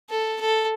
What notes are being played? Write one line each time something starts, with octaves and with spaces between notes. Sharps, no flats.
A4
A4